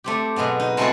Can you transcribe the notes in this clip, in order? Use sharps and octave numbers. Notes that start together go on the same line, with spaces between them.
A3 C4 G4
B2 F#3 G#3 B3
D#4
G#3 A3 C4 E4 F#4 A4